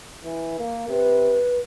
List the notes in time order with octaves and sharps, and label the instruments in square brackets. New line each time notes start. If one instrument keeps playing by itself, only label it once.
[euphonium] E3
A#3
[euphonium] C3 [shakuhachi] B4